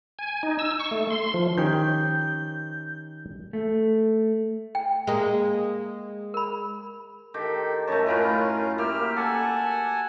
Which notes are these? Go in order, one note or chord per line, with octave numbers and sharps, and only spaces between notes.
G#5
D#4
E6
C#6
A3
C6
F3
D#3 C#4 G4 G6
A3
G5
G#3 A#3
A#4 B5
D#3 G4 A4
F#2 A3 C#5 A5
A2 C#4 F4 A#4 B4
A#3 G4 E5 F6
A4 F#5 G#5 A5